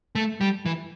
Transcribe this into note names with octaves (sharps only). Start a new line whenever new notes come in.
A3
G3
E3